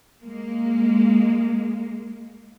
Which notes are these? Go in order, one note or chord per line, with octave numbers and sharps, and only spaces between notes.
G#3 A#3